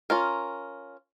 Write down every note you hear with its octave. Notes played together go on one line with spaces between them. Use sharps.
C#4 F4 A#4